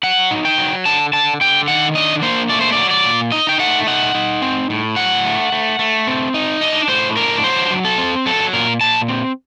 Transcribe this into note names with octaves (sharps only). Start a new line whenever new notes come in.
F#3 F#5
D#4
G5
F#3
D3 A5
D3 A5
D3 G5
D#3 F#5
D4 D#5
A#3 C5
A3 D5
C5
F#3 D5
D5
A#2
D#4 D#5
G5
A3 F#5
D#4 F#5
D#4
C4
A2
F#3 F#5
A3
A3
A3
C4
D#4
D4 D#5
A2 C5
D4 A#4
F#3 C5
F#3
A4
C4
F#3 A4
A#2 A#4
A#2 A5
C4